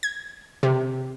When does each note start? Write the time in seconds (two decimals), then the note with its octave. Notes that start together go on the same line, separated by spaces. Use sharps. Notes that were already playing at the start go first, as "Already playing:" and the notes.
0.03 G#6
0.63 C3